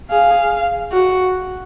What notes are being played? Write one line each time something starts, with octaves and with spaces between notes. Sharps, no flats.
G#4 F5
F#4